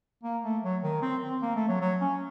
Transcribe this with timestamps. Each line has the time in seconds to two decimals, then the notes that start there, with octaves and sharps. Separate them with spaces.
0.24 A#3
0.44 A3
0.63 F#3
0.83 D#3
1.02 C4
1.23 C4
1.42 A#3
1.55 A3
1.68 F#3
1.81 F#3
2.01 C#4